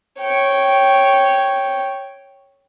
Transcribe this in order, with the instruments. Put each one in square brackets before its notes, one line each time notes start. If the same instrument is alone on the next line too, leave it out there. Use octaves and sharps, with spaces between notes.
[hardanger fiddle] C#5 G5